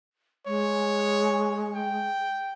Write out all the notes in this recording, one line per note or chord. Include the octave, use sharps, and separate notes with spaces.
G#3 C#5
G5